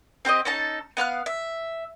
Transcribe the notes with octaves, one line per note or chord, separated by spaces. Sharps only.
C4 G4 D5 D#5
C#4 D#4 A4 A5
B3 F5 F6 F#6
E5